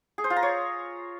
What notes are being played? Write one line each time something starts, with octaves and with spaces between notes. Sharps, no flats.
G#4
C5
F4
A#5
C#5